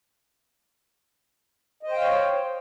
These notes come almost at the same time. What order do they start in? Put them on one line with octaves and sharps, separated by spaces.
D#5 C5 G5 F5 C#5